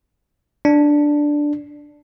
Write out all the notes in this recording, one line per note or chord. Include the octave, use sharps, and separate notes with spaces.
D4